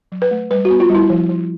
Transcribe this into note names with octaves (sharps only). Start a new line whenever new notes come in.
F#3
B4
A3
G3 B4
F#4
B3
F4
G3
E4
F3
F3